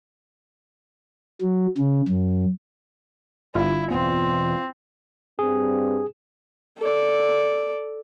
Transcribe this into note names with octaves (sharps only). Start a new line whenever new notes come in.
F#3
C#3
F#2
G1 E4 F4
E1 B3 C4
G2 C4 G#4
A4 D5